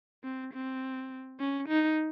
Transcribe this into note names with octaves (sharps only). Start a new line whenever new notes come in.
C4
C4
C#4
D#4